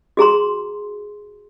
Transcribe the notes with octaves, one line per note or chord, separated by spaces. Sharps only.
F#4 G#4 A#5 C6